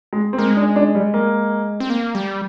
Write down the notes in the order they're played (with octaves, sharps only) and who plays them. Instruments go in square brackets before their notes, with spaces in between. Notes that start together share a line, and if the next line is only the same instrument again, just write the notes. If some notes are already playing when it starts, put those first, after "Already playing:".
[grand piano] G#3
C4
[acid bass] G#3 [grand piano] A#3
[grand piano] D4
D4
G3
A#3
[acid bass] C4
A#3
G3